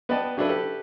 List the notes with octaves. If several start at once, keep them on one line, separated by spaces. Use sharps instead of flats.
B3 B4 D5 D#5 G5 A5
C#3 F#3 D4 E4 A4 B4
G4 A4 B4